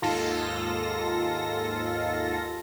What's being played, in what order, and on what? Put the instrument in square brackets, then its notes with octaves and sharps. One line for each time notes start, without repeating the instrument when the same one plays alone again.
[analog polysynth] D#2 G#2 F4 A4 A#6